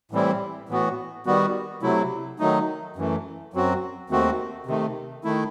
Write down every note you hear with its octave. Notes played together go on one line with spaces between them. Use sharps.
A2 E3 G3 C4 E4
A2 E3 B3 F#4
D#3 G3 B3 F#4
C3 F#3 A3 E4
D#3 F#3 A3 D#4
F#2 E3 A3
F#2 F#3 C4 F#4
D#2 D#3 A3 C4 F#4
C3 D#3 A3
D#3 A3 E4